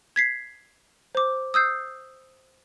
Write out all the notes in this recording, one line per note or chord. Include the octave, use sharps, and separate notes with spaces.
G#6 B6 C7
C5 D6
D#6 E6 G6 C7